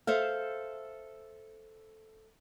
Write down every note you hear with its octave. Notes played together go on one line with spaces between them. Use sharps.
A4 C5 E5 F5